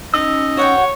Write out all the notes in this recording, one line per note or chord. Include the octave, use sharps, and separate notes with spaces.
C#4 D#4 E6
F#4 C#5 F#5 G5